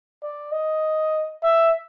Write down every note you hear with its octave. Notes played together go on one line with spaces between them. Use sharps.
D5
D#5
E5